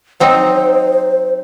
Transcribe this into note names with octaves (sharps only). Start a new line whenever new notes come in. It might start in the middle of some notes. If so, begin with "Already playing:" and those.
F#3 C4 D#4 C5